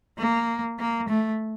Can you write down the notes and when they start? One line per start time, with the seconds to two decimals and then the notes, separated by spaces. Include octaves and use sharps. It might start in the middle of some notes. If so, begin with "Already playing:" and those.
0.18 A#3
0.79 A#3
1.09 A3